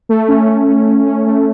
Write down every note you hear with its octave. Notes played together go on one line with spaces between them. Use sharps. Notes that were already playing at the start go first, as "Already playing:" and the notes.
A3
C#4
A3
C#4
C#4
C#4
A3